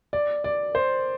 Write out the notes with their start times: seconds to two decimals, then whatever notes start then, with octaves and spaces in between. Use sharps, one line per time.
0.13 D5
0.44 D5
0.75 C5